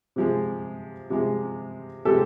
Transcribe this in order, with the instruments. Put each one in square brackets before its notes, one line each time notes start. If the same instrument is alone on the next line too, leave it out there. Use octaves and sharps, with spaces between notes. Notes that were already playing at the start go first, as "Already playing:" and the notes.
[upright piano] C3 F3 G#3
C3 F3 G#3
C3 F3 G#3 G4 A4